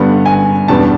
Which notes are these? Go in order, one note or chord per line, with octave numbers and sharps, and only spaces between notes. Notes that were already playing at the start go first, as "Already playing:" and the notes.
Already playing: G2 D3 G3 B3 D4 F#5
G#5
E2 B2 G3 B3 D4 A5